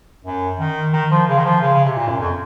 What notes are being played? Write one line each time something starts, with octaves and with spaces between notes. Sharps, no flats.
F#2
D#3
D#3
F3
C#3
D#3
F3
C#3
C#3
C3
A#2
F#2
F2